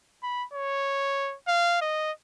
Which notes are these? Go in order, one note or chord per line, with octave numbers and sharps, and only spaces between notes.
B5
C#5
F5
D#5